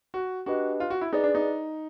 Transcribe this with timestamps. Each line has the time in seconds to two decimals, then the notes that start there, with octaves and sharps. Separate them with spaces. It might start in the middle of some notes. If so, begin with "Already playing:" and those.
0.14 F#4
0.46 D4 F#4 G4 B4 D#5
0.80 F4
0.90 F#4
1.01 E4
1.13 D#4 G#4 B4 D5
1.24 D4
1.35 D#4